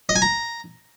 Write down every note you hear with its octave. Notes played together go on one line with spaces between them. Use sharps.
D#5
G#5
A#5